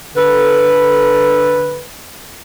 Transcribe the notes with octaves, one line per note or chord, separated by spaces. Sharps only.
D3 A4 B4